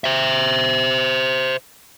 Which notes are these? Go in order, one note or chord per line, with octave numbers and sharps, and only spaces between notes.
C5 E5